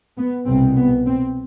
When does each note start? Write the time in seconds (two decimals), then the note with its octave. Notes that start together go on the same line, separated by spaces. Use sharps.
0.18 B3
0.47 C2 B2 C4
0.77 B3
1.06 C4